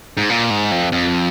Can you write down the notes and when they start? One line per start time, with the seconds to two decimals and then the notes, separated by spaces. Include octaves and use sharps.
0.17 G#2
0.29 A#2
0.50 G#2
0.72 F2
0.92 F2